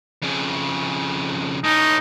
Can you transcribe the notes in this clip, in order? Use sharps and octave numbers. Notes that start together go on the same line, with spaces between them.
F2 C#3
A2 C#4 D#4